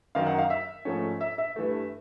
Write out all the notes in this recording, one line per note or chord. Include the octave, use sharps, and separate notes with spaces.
F#2 D#3 F#3 F5
F#5
F5
E5
G#2 F3 A3 C#4
E5
E5
G2 E3 A3